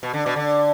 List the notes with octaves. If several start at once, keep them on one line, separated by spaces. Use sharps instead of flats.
B2
D3
B2
D3